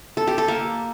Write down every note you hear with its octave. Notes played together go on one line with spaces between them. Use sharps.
A4
G4
A4
A#3